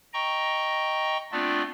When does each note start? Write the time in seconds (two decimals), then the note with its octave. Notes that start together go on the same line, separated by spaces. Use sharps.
0.13 D#5 G5 A#5 C#6
1.32 A3 B3 C4 D4 F4 D5